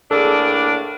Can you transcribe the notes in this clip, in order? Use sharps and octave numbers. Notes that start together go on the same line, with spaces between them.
A2 A#3 D4 G#4 A4